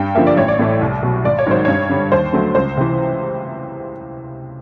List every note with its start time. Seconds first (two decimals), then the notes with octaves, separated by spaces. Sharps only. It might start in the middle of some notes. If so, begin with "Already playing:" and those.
Already playing: G2 G5
0.15 D3 F3 A#3 E5
0.27 D5
0.37 A1 C#5
0.48 D5
0.59 A2 E3 A3
0.81 C2
1.03 B2 F#3
1.24 G#1 D5
1.39 C#5
1.47 G#2 D#3 F#3 C5
1.65 G2 C#5
1.89 D3 G3
2.12 D#2 C5
2.33 D3 F#3 A3
2.55 C#2 C5
2.77 C3 E3